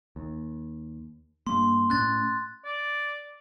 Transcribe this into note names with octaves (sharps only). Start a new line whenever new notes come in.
D#2
G2 A#3 C6
A2 A3 C#4 F#6 A6
D5